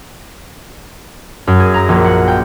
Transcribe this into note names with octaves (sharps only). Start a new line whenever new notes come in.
F#2
G#4
A#5
A#1
F#5
G5